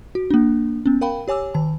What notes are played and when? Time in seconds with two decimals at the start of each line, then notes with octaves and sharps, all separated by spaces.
0.15 F#4
0.30 A#3 D4
0.86 B3 C#4
1.01 A#4 F5 G5 B5
1.28 G4 C#5 G#5 D6 E6
1.54 D#3 A5